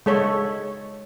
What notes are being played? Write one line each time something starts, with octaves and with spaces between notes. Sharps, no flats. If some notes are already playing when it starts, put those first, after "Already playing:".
G#3 A4 C#5